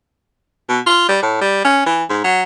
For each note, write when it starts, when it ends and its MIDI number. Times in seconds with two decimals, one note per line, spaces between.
0.69 0.80 47
0.87 1.06 65
1.09 1.19 55
1.22 1.38 45
1.42 1.60 55
1.64 1.82 61
1.86 2.04 52
2.10 2.22 44
2.24 2.43 54